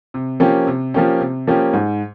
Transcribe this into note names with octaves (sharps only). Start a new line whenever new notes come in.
C3
F3 A#3 C#4 G4
C3
F3 A#3 C#4 G4
C3
F3 A#3 C#4 G4
G#2